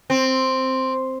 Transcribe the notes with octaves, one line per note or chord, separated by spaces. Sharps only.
C4